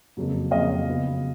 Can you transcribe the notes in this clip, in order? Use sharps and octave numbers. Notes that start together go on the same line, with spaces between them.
F2 C#3 F#3 A#3
F2 C#3 F#3 A#3 D#5 F5
C#3 F#3 B3